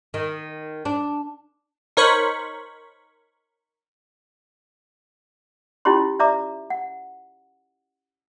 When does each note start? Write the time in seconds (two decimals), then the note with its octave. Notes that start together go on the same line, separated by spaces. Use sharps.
0.14 D#3
0.85 D4
1.97 D#4 A#4 C5 C#5 B5 C#6
5.85 C#4 E4 F4 G4 C#5 C6
6.20 D5 E5 A#5 D6
6.70 F#5